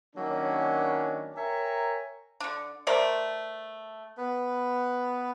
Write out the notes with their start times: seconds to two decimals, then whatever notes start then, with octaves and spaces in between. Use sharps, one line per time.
0.16 D#3 F#3 A#3 C#4 D4
1.36 A#4 C#5 E5 G5 G#5 A#5
2.40 D3 D4
2.87 A3 A#4 C5 D5
4.17 B3 B4